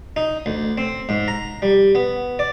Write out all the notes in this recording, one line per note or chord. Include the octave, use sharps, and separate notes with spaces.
D#4
D2
C4
G#2
A#5
G3
B3
D5